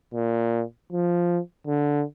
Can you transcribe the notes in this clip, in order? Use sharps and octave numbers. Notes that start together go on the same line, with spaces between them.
A#2
F3
D3